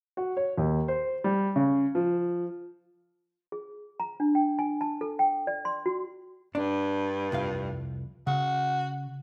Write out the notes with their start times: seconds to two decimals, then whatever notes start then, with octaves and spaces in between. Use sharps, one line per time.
0.17 F#4
0.37 C#5
0.58 D#2
0.88 C5
1.24 G3
1.56 C#3
1.95 F3
3.52 G#4
4.00 A#5
4.20 D4
4.35 G5
4.59 G#5
4.81 A5
5.01 A4
5.19 G5
5.47 D5
5.65 C6
5.86 F#4
6.55 G2 D4
7.32 C2 F2 F5
8.27 C#3 F#4